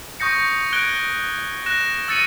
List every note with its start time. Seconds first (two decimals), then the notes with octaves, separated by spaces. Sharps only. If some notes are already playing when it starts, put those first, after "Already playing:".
0.20 C#6 D#6 G6 A#6 C#7
0.73 F#6 G#6 D7 G7
1.66 F#6 A#6 E7
2.08 E6 A6 C#7 D#7